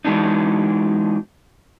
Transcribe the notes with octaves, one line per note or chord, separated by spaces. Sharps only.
E3 F#3 G#3 B3 D4 D#4